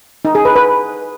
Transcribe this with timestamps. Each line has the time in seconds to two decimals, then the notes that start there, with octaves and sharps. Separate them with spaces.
0.25 D#4
0.35 G#4
0.45 B4
0.56 B4